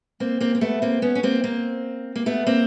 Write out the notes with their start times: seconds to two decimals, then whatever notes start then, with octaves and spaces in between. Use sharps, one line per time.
0.20 A#3 C4
0.40 A#3 C4
0.55 C4
0.61 A3 B3
0.82 A#3 C4
1.02 B3 C#4
1.15 C#4
1.23 A#3 C4
1.44 A#3 C4
2.16 A#3
2.26 A3 B3
2.47 A#3 C4